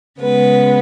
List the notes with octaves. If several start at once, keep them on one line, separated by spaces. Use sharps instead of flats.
C#3 G#3 B3 B4